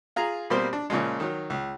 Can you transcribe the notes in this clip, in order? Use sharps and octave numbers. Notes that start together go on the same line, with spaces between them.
F4 G#4 A#5
B2 G3 A#3 C4 C5 C6
D4
A#2 C#3 F3 G#3
D#3 F#3
C#2